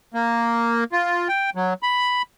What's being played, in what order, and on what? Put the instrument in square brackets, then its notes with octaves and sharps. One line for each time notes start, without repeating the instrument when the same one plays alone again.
[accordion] A#3
F4
G5
F#3
B5